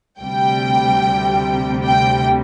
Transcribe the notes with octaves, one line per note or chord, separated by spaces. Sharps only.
D2 C3 G3 G5
G5